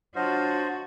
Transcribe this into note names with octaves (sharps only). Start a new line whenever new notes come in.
F#3 D4 F4 F#4 C5 D#5 F#5